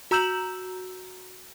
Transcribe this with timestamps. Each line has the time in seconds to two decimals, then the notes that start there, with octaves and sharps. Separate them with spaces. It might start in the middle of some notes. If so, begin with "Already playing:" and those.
0.11 F#4 A#5 E6 G6 E7 F#7